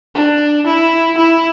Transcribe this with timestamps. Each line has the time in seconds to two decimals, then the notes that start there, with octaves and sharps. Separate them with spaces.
0.15 D4
0.66 E4
1.17 E4